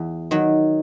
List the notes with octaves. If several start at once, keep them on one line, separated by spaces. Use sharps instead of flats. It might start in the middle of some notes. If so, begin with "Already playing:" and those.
Already playing: E2
D#3 F#3